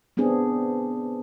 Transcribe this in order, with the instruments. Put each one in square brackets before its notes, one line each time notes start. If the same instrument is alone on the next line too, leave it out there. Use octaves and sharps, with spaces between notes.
[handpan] B3 C4 D4 G#4